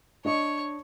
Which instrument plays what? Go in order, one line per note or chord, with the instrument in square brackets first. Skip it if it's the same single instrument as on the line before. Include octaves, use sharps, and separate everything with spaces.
[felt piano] D4 D#5 [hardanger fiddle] C#5 C#6